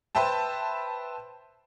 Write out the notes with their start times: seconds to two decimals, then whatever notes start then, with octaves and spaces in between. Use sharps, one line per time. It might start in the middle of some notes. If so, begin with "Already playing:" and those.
0.15 B4 C5 E5 G5 A5